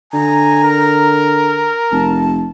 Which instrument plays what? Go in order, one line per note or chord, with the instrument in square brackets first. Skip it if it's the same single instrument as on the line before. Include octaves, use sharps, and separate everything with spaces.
[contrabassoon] D3 [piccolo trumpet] G#5 [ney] A#5
[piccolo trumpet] A#4
[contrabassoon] F1 [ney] A5